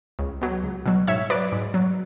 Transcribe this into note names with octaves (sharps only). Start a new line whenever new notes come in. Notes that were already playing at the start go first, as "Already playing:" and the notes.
C#2
B2 F#3
C#2
B2 F#3
G#2 C#5 E5
F#3 B4 D5
G#2
F#3